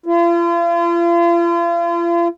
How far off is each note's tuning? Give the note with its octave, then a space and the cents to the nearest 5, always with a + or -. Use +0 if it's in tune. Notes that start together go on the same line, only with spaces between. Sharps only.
F4 -40